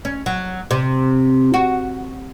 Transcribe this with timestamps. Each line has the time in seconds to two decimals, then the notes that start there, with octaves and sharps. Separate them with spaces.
0.05 C#4
0.26 F#3
0.71 C3
1.54 F#4